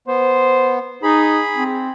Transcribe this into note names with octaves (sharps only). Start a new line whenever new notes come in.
B3 C5
D#4 G#4 B5
C4